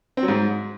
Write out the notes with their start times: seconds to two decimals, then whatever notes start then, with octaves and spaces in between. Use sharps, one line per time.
0.17 C4
0.23 F#3
0.28 G#2